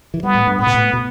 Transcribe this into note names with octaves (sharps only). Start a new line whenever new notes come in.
E3
G3 B3
A2
G2
A2 B3
B2
A2
B2